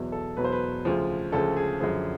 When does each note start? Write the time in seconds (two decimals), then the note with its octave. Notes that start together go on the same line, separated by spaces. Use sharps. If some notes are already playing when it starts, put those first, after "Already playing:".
Already playing: E2 B2 F#3
0.12 A4
0.37 E2 B2 F#3 B4
0.44 C5
0.52 B4
0.85 D2 C#3 F3
1.32 D2 C#3 F3 A4
1.56 G#4
1.80 F#2 D3 F3 G#4